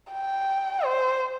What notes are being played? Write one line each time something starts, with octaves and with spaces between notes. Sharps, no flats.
G5
C5